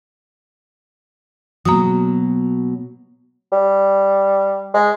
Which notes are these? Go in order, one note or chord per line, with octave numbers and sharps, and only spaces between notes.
B2 F#3 A#3 D#6
G3
G#3